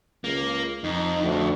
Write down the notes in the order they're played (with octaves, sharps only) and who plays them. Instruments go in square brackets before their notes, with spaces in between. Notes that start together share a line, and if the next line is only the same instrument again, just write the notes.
[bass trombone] C#2 [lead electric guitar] A#3
[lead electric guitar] F2 [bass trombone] D#4
[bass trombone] D2